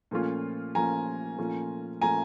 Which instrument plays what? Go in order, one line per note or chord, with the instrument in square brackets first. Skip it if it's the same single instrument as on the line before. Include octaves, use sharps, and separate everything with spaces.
[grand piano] A#2 F3 A3 C#4 F4
[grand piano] A#2 F3 A3 C#4 F4 [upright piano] G#5 A#5
[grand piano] A#2 F3 A3 C#4 F4
[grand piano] A#2 F3 A3 C#4 F4 [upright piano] G#5 A#5